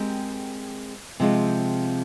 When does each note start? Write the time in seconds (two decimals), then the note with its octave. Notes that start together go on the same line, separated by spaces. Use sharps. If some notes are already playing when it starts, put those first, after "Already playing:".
Already playing: G#3 C4 G4 A#4
1.20 C3 F3 G#3 C4 F4